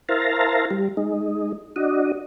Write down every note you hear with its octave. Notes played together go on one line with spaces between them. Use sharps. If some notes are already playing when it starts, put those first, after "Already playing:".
E4 A#4 C5 F5 A5 A#5
G3
G#3 D#4
D4 F#4 D#5